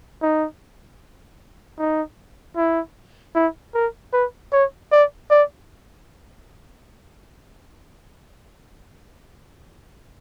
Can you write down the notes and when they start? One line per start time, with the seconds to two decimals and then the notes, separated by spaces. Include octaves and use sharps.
0.22 D#4
1.78 D#4
2.56 E4
3.35 E4
3.74 A#4
4.13 B4
4.52 C#5
4.92 D5
5.31 D5